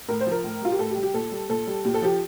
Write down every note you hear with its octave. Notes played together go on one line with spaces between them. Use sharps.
A2 A#4
C5
F3
A#4
A2
G3 F4
G4
A2 A4
G4
G3
G4
A#2 A4
G3
A#2 A4
G3
A#2 G4
A4
F3 G4